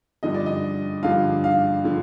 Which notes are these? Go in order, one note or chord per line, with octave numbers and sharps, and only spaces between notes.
G2 D3 F3 D#5
D5
D#5
G2 D3 F3 F5
F5
D3 F3